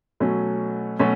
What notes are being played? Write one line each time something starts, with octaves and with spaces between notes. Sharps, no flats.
B2 F#3 A3 C#4
B2 F#3 A3 C#4